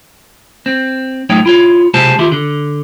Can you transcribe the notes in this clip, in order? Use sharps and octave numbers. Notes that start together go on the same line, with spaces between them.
C4
A2 F#3 D#4 C#5 G5
E4 F4 C#5
B1 C3 G#3 G4 C5 A5
D#3 E4 F4 G4
D3